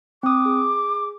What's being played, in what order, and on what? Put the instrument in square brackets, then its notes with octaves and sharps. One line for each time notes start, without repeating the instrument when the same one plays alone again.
[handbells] C4 D#6 [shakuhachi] D6
[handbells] G#4